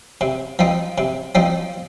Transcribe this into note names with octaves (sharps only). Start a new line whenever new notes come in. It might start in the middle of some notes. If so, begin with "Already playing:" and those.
C3
F3 C4 D#4
C3
F3 C4 D#4